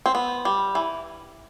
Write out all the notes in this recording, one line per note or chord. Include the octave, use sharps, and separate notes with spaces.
C4
B3
G3
E3